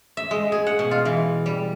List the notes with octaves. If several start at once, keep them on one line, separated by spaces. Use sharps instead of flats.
E5
G#3
G#4
F#5
B2
F4
E3
G3